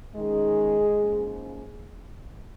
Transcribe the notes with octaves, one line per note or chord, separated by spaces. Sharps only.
D#3 G#3 C#4 G#4
G#2 F3 A#3 C#4